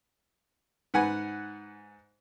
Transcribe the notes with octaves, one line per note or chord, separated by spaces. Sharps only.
G#2 B4 F#5 G#5